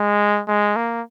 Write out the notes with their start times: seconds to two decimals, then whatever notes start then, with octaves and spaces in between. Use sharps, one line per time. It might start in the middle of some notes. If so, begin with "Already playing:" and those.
Already playing: G#3
0.48 G#3
0.76 A#3